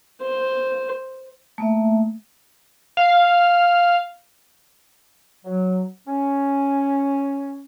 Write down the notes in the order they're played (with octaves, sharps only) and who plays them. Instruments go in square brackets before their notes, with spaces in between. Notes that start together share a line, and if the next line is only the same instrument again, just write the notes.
[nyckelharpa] C5
[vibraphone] A3 A#3 E5
[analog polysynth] F5
[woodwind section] F#3
C#4